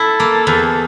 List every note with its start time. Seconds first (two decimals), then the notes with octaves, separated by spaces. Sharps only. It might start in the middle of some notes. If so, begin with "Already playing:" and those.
Already playing: E4 A4
0.20 A#3
0.47 E2